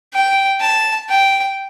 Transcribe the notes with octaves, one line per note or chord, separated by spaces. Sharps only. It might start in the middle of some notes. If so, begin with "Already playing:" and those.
G5
A5
G5